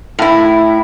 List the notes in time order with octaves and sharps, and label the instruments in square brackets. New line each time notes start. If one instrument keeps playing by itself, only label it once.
[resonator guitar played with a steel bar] A2 E4